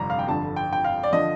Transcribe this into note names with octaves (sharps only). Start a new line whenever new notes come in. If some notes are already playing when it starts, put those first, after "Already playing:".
Already playing: G1 F2 C3 G3 A#5
F5
G5
G1 F2 D3 G3 A5
G5
G5
F5
D5
D3 F3 D#5